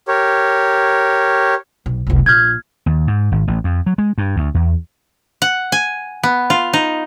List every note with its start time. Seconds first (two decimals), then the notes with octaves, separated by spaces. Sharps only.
0.08 G4 A#4 C#5
1.86 B1
2.07 F1 C2
2.26 A#1 F6 G6 G#6
2.86 D#2
3.07 G#2
3.32 G#1
3.48 A1
3.64 F2
3.86 F#3
3.98 G#3
4.18 G2
4.36 D2
4.54 E2
5.42 F#5
5.72 G#5
6.23 B3
6.50 F4
6.73 D#4